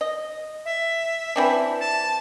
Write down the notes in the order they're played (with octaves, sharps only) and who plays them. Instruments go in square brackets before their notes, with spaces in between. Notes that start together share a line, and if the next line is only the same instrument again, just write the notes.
[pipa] D#5
[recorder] E5
[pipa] E3 C4 D4
[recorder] A5